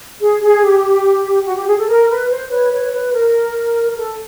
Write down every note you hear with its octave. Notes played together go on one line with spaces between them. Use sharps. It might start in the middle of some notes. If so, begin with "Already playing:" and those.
G#4
G#4
G4
F#4
G4
G#4
A4
A#4
B4
C5
B4 C#5
B4 C#5
B4
A#4
A4